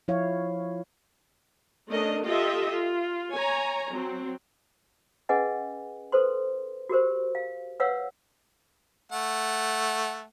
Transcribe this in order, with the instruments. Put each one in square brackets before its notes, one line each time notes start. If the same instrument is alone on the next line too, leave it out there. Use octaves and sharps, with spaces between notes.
[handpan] F3 E4 C#5 F5
[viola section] A3 C#4 D4 A#4 D#5
F4 G4 A4 D#5 E5
F4
C#5 G#5 A#5
F#3 C4
[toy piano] C#4 G#4 B4 D#5 F#5 G#5
A4 B4 C5 C6
F#4 G4 A#4 C5
F5
B4 C#5 F5 F#5 E6
[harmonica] A3 F#5